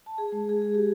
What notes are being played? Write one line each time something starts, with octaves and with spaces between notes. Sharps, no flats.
A5
G#4
G#3
G#4
G#4
G4